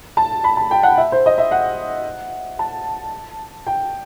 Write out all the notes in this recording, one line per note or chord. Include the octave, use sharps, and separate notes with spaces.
A5
B5
A5
G5
F#5
E5
C5
D#5
E5
F#5
A5
G5